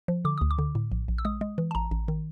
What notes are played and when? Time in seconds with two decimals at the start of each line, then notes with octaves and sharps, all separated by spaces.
0.08 F3
0.25 D3 D6
0.38 D2 D#6
0.51 D6
0.58 D3
0.75 A2
0.92 A#1
1.08 A#1
1.18 E6
1.25 G#3 D#6
1.41 G#3
1.58 E3
1.71 A5
1.75 A1 A#5
1.91 A1
2.08 D#3